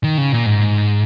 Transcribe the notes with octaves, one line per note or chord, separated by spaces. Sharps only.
D#3
C#3
A#2
G#2